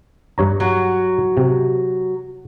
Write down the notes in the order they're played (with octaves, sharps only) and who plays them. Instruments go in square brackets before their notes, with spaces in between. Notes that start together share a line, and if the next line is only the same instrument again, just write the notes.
[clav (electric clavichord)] G2 C#5 A#5
[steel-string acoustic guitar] F#3
[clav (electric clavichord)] C3